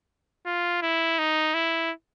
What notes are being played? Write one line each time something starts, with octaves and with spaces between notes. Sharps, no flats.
F4
E4
D#4
E4